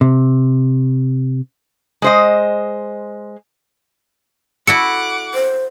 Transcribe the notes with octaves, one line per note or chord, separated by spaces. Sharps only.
C3
G#3 C5 D#5
E4 F#4 A4 F#5 D6 C#7
C5